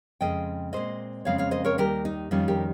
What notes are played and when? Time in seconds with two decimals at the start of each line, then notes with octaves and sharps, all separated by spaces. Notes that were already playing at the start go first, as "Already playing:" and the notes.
0.21 F2 C#3 G#3 C4 D#5 G5
0.73 A#2 G#3 C4 C5 D#5
1.25 F2 C#3 G#3 C4 C#5 F5
1.38 C#5 F5
1.51 C5 D#5
1.65 A#4 C#5
1.78 D#2 D#3 G3 G4 A#4
2.05 D#4
2.31 F2 D#3 G3 C#4 F4
2.48 G4 A#4